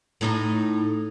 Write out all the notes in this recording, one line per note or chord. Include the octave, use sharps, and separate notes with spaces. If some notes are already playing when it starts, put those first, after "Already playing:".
A2 D#4 D#5